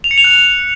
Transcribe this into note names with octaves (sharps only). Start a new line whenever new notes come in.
F7
C#7
F7
F#6
F7